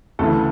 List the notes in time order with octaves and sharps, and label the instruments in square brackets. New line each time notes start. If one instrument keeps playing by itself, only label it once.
[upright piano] D2 C#3 E3 A4